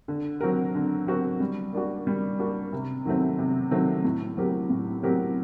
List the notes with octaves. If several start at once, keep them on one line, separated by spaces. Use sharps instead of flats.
D3
F#3 C4 F#4 A#4
D3
F#3 C4 F#4 A#4
G3
A#3 D4 F#4
G3
A#3 D4 F#4
C3
D#3 F#3 A3 C4
C3
D#3 F#3 A3 C4
A2
F#3 C4 G4 A#4
A2
F#3 C4 G4 A#4